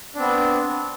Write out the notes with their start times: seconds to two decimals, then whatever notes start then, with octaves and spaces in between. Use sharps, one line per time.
0.15 D4
0.18 C4
0.21 B3